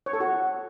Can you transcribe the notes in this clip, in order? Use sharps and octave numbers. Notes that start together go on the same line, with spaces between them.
C#5
A4
F#4